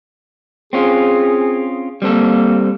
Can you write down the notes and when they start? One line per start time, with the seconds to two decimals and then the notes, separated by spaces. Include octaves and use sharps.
0.73 C4 C#4 F4 G#4
2.02 G3 A#3 C4 A4